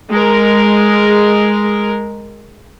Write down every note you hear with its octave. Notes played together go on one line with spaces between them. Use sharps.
G#3 A#4